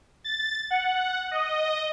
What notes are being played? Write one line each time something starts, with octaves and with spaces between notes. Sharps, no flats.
A6
F#5
D#5